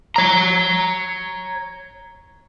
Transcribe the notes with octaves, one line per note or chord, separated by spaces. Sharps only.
C#5 A#5